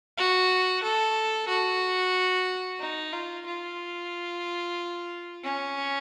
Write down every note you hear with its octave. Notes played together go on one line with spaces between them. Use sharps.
F#4
A4
F#4
D#4
F4
F4
C#4